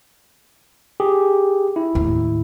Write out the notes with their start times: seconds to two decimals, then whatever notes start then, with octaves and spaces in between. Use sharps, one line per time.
1.00 G4 G#4
1.76 E4
1.95 D#2 A2